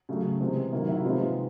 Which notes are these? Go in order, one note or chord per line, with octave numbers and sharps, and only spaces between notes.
C#3 F#3 A3
C3 E3 G#3
D#3 F#3 A#3 E4 F#4
E4 F#4
C3 F3 G#3 B3 D#4 F4